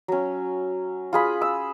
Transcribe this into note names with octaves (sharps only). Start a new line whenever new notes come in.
F#3 C#4
F4 G#4 B5
E6